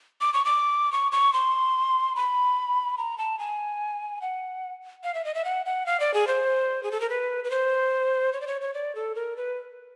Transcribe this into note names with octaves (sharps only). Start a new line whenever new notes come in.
D6
C#6
D6
C#6
C#6
C6
B5
A#5
A5
G#5
F#5
F5
E5
D#5
E5
F#5
F#5
F5
D5
G#4
C5
G#4
A4
A#4
B4
B4
C5
C#5
D5
C#5
C#5
D5
A4
A#4
B4